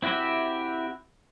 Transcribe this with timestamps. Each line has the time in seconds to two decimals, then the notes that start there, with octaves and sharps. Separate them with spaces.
0.02 C4 E4 F#4 G4 E5